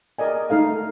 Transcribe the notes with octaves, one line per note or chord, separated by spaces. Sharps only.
A#4 D5 D#5 G#5
A3 D#4 A4 F5